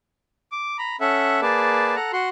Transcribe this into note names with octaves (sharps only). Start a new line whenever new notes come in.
D6
A#5 B5
C#4 A4 E5 F#5
A#3 G#4 B4 D5 A5
A4 F#5 A#5
F#4 F#5 C6